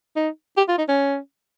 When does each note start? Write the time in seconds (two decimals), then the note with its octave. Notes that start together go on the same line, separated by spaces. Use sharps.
0.16 D#4
0.57 G4
0.68 F4
0.78 D#4
0.88 C#4